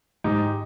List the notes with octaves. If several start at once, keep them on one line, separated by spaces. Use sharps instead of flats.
G#2 D#4 G4